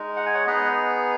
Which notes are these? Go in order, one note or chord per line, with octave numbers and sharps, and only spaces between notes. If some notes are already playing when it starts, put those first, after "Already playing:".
Already playing: G#3 D#4
F#5
G#5
C#5 F#5
B3 D#4 G#4 B4 D#5